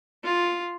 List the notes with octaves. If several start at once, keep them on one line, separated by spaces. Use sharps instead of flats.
F4